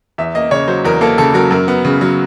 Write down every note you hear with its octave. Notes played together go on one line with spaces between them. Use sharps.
E2 E5
A#3 D#5
C#3 C#5
F#3 C5
E2 A#4
A#3 A4
C#3 A4
F#3 A#4
F#2 A#4
B3
C#3
F#3